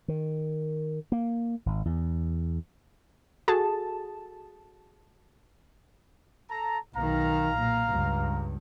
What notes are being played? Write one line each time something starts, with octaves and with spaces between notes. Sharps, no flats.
D#3
A#3
G#1
E2
F#4 G#4 A4 A5
A4 A5 A#5
B1 D#3 F5 A#5
A#2
C#2 G2